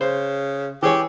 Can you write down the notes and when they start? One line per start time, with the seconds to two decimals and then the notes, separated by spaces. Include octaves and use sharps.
0.01 C#3 C5
0.83 E3 G4 G#4 C#5